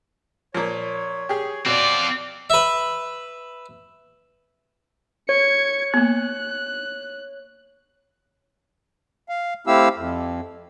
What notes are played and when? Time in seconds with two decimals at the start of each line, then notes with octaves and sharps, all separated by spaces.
0.54 A#2 F3 C#5
1.29 G4 G#4
1.66 B2 C4 F4 D5
2.50 B4 E5
5.29 C#5 G#6 C#7
5.94 A#3 B3 F#6
9.29 F5
9.67 A3 C4 E4 G4 F5 E6
9.97 F2